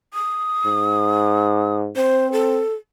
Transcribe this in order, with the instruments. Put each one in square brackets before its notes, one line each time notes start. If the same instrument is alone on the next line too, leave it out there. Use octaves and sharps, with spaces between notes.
[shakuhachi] D#6
[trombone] G#2
[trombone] C4 [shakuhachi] C5
[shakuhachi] A4